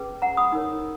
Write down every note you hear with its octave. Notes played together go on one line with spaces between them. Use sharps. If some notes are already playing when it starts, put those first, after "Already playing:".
Already playing: C#4 G#4 B4
F#5 A#5
B5 D#6
D#4 A#4 C#5